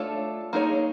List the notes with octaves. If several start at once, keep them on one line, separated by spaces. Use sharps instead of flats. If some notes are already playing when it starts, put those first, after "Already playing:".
Already playing: A3 D4 F4 A4 C#5
A#3 D#4 G#4 C#5